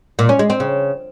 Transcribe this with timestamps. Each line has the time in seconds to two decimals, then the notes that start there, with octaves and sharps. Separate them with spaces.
0.19 A#2
0.29 C#4
0.39 G#3
0.50 C4
0.60 C#3